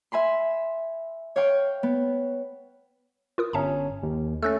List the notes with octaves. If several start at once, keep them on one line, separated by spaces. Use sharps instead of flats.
E5 G#5 B5 C6
C#5 F5 G5 C#6
B3
F4 A#4 D#6
G1 C#4 E5 A5 A#5
D#2
A3 C#4 E6 F#6 A6